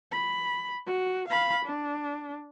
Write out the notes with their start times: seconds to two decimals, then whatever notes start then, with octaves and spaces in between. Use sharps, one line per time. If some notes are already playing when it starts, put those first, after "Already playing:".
0.12 B5
0.86 F#4
1.28 F5 B5
1.65 D4